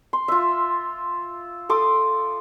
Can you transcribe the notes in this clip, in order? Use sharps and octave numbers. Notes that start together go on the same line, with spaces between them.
C6
F4 E5
A4 C6 D6 D#6